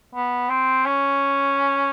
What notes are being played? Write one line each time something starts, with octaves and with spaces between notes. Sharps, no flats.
B3
C4
C#4